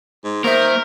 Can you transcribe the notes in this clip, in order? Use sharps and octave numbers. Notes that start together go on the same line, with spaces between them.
G#2
D#3 A#3 A#4 C5 E5